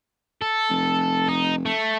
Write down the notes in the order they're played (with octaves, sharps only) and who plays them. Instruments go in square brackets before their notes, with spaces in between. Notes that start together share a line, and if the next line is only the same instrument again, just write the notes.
[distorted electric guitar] A4
[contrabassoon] F1
[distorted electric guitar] D#4
A3